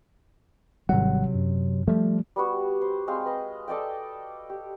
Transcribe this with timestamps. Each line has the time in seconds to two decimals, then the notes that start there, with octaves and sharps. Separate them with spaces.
0.89 G#1 C3 F#3 G3 F#5
1.34 F#2
1.88 F3 G3 A3
2.36 G3 B3 F#4
2.81 C5
3.07 G#3 C4 F5
3.25 B4 D#5
3.68 A4 D5 D#5 G5
4.50 G4